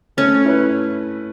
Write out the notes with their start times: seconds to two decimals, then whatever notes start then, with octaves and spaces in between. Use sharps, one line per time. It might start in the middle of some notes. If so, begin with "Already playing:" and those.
0.17 A3 C#4
0.45 E4 B4